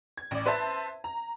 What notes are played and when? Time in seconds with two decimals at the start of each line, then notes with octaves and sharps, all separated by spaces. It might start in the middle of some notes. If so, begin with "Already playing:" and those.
0.17 G#6
0.31 A1 D5
0.46 B4 C5 E5 A5
1.04 A#5